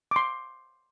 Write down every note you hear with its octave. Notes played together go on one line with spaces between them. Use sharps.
D6
C6